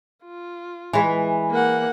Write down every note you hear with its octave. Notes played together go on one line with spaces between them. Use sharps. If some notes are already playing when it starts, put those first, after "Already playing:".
F4
E3 G#3
A#3 F#5